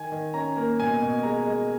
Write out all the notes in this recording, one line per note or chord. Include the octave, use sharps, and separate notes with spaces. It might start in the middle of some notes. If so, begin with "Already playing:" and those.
Already playing: D#3 G#5
D#3
C#4 A#5
A#3
B2 G#5
B2
G#3 A#5
G#3